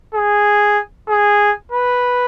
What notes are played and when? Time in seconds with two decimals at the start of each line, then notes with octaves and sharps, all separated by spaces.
0.15 G#4
1.09 G#4
1.72 B4